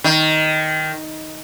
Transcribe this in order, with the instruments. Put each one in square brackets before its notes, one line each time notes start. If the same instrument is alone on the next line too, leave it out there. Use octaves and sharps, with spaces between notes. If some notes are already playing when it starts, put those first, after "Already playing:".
[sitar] D#3